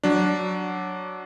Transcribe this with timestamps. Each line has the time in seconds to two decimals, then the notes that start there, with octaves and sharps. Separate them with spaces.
0.04 F#3 D4